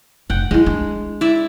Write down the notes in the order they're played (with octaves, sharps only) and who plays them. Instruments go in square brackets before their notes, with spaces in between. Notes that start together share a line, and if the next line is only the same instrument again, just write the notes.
[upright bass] F1 [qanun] F#5 G5
[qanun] G#3 [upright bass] C#4 E4
[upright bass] D4
[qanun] E4 D5 E5